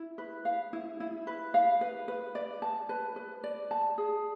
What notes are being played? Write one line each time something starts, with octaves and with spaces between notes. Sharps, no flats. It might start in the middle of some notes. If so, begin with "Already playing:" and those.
Already playing: E4
B4
F5
E4
E4
B4
F5
B4
B4
D5
A5
B4
B4
D5
A5
G#4